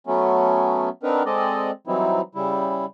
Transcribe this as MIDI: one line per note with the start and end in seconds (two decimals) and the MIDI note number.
0.07 0.89 54
0.07 0.89 57
0.07 0.89 59
0.07 0.89 61
1.03 1.23 59
1.03 1.23 60
1.03 1.23 62
1.03 1.23 63
1.03 1.23 70
1.03 1.23 71
1.26 1.71 56
1.26 1.71 60
1.26 1.71 69
1.26 1.71 74
1.26 1.71 75
1.87 2.21 52
1.87 2.21 54
1.87 2.21 55
1.87 2.21 60
1.87 2.21 63
1.87 2.21 64
2.35 2.85 49
2.35 2.85 55
2.35 2.85 64